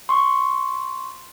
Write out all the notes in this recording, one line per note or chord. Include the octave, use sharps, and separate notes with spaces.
C6 C#6